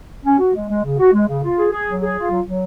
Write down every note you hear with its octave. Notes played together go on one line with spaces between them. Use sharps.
C#4
F#4
G#3
G#3
C#3
F#4
G#3
C#3
F4
G#4
G#4
F#3
G#4
F4
F#3
F#3